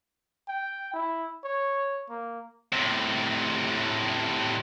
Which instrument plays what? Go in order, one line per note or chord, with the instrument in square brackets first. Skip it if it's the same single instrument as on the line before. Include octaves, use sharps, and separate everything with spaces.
[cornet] G5
E4
C#5
A#3
[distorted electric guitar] A2 C3